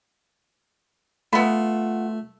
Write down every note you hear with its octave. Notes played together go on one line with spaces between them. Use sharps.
A3 B3 F4 F#5 B5